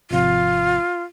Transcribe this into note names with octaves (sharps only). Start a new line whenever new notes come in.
G#1 C3 F3 F4